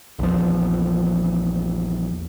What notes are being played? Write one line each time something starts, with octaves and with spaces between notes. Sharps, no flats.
A#1 E2 F3